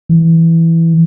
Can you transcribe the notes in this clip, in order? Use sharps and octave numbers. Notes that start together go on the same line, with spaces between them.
E3